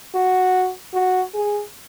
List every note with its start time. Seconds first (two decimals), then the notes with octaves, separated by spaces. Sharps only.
0.15 F#4
0.94 F#4
1.34 G#4